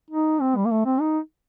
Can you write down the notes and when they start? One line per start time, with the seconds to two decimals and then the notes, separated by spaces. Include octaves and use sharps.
0.10 D#4
0.41 C4
0.56 G3
0.65 A#3
0.71 A3
0.86 C4
1.01 D#4